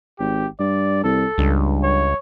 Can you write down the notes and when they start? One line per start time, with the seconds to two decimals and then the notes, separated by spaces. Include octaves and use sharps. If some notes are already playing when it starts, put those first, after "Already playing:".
0.19 G#1 G4
0.60 G2 D5
1.04 C2 A4
1.38 C#2 G2
1.83 C#5